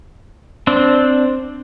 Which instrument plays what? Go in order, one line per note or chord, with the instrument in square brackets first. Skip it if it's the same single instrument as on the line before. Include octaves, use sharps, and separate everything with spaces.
[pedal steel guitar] C4 D4